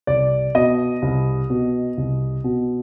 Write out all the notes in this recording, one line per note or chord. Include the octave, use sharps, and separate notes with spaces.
C2 D5
B2 D#5
C2
B2
C2
B2